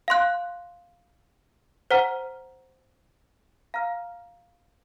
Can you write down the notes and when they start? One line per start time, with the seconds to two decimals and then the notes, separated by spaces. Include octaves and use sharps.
0.08 F5 C6 F#6
1.91 C5 F#5 A#5 F6
3.74 F5 A#5 F6